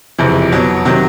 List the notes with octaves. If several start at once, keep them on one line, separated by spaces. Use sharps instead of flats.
F#1 F2 C3 E3
B2 F#3 B3
C3 D#3 F#3